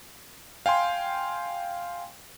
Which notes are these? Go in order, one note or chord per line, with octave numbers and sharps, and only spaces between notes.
F5 G5 G#5 C6